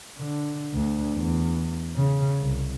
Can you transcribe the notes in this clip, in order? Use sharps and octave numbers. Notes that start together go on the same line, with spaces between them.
D3
D2
E2
C#3
C2